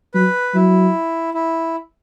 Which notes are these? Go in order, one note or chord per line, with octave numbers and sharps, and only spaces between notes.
F#3 B4
F#3 E4
E4